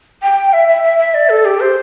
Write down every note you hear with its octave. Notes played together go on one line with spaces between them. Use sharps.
G5
E5
E5
E5
E5
D5
A4
G4
C5